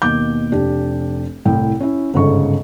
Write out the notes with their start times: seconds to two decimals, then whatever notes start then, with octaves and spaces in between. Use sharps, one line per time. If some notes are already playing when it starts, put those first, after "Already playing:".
0.02 D#2 B2 D6 G6
0.52 F1 D4 G4
1.45 C2 A2 G5
1.81 C#4 E4
2.14 G1 G#2 C#3 A4 C#6